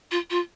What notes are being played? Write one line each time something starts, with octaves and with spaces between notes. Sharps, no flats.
F4
F4